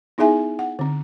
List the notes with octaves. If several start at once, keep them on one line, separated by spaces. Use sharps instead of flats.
B3 D#4 E4 G#4 E5 G#5
F#5
D3 C4